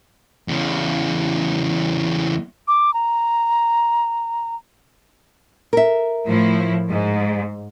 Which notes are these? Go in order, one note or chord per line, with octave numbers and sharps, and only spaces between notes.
E2 C#3
D6
A#5
A#4 E5
A2 F3 E4
G#2